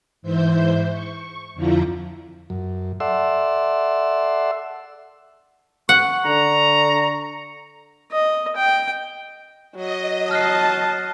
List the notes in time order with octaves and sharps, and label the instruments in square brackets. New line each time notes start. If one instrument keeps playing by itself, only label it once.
[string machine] G#2 E3 C5 E5 G6
C#6
F2 D3 F3 E4 F4 A#5
[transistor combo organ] F#2
A4 D5 E5 F#5 C6 E6
[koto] F#5 [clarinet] C#6
[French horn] D3 [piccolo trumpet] A#5
[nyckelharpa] D#5
G5
[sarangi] F#3 [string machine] D#5
[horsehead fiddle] A5 [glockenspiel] F6 F#6 C7